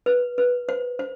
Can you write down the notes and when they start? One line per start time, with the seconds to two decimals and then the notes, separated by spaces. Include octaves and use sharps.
0.06 B4
0.38 B4
0.69 C5
0.99 C5